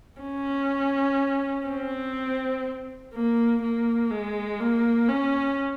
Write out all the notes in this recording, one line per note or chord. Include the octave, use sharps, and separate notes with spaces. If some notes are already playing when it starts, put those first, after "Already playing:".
C#4
C4
A#3
A#3
G#3
A#3
C#4